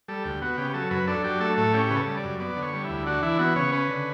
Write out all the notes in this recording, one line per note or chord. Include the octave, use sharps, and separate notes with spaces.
G3 A4
D2 G4
B3 F#4
C#3 G4
F#3 A4
F#2 B4
D4 A4
F#3 G4
A3 A4
A2 A4
C#4 G4
C#3 B4
A4
G3
D5
F#2
B3 D5
D3
C#5
G3
E4
D2
D4 F#4
E3 E4
B3 F#4
C#3 C#5
C#4 B4
D3